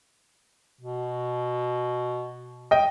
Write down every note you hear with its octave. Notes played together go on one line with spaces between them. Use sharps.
B2
D#5 G5